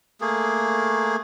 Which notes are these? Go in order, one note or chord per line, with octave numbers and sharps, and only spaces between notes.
A3 A#3 G#4